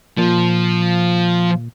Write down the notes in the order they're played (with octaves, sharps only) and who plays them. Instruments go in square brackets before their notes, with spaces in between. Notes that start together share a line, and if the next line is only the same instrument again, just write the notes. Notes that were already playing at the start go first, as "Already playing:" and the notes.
[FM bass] A#2 [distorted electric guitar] F3